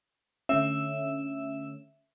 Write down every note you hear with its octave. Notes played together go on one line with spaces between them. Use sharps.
D3 A3 C#4 E5